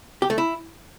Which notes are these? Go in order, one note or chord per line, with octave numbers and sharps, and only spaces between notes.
G4
A3
E4